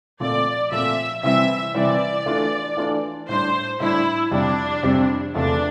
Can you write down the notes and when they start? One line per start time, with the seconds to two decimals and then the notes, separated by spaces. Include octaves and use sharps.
0.20 A#2 F3 A3 C4 D5
0.71 A#2 F3 A3 C4 E5
1.23 C3 E3 G3 C4 E4 E5
1.74 C3 E3 G3 C4 E4 D5
2.26 E3 A3 D4 F4
2.77 E3 A3 D4 F4
3.28 A2 G3 D4 C5
3.80 A2 G3 D4 E4
4.31 F2 C3 G3 C4 D4 G4
4.83 F2 C3 G3 C4 G4
5.34 E2 C3 F3 A3 D4